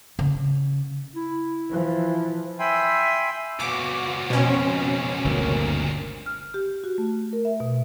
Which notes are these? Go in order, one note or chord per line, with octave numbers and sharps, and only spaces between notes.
C#3
E4
E3 F3
E5 G5 G#5 B5 C6
C#2 A#2 B3 F#4 D6
F2 B2 C4 C#4
G1 D2 D3 A#3 C4 A#4
F6
G4
F#4
A3
A#4
E5
B2